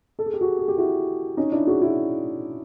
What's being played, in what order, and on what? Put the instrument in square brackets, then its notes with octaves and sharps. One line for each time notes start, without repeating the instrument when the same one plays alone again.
[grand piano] A4
G#4
G4
F#4 G#4
G#4
G4
E4 F#4
C#4 D#4
D4 E4
F#4 G#4
E4 F#4